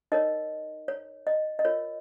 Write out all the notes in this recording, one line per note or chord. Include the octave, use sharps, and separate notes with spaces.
D#4 A#4 C#5 D#5
C#5
D#5
D#5
F4 A#4 C#5